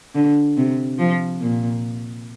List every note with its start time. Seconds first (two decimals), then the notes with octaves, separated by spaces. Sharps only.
0.15 D3
0.57 C3
0.98 F3
1.41 A#2